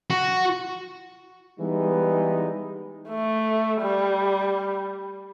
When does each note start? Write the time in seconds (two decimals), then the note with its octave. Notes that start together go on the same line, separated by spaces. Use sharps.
0.10 F#4
1.60 E3 G3 G#3 B3 D#4
3.09 A3
3.81 G3